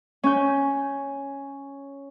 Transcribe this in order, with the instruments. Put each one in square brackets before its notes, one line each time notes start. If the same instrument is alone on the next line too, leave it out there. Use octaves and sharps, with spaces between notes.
[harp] C#4 G6